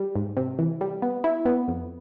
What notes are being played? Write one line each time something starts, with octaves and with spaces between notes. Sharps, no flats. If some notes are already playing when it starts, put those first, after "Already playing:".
Already playing: G3
G#2
C3
E3
G3
B3
E4
B3
F2